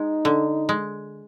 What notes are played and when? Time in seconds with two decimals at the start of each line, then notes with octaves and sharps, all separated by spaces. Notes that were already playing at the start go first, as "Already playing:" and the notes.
Already playing: G#3 D#4
0.25 D3
0.69 G#3